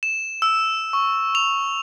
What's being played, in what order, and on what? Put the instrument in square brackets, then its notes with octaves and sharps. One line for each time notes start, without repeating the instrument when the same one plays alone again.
[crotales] E7
E6
C#6
F7